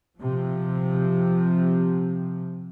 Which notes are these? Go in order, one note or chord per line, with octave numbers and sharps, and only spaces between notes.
C3 F3